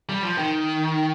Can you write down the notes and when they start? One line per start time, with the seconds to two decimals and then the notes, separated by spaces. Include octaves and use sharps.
0.09 G3
0.23 F3
0.38 D#3